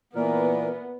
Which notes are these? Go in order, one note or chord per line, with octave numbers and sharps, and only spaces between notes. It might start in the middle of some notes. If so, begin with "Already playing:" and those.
A#2 E3 B3 A#4